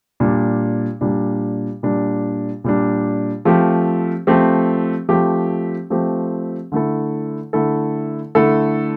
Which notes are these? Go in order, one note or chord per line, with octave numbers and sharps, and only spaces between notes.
A#2 G3 D4
A#2 G3 D4
A#2 G3 D4
A#2 G3 D4
F3 A3 C4 G4
F3 A3 C4 G4
F3 A3 C4 G4
F3 A3 C4 G4
D3 A3 E4 A4
D3 A3 E4 A4
D3 A3 E4 A4